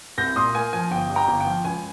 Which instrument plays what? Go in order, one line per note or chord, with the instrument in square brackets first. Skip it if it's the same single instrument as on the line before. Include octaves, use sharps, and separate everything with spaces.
[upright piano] C2 G6 A#6
A#2 C6 D#6
A#3 G#5
F3 G#5
G1 G5
G2
G5 A#5
G1
G5
F3
C#2 G#5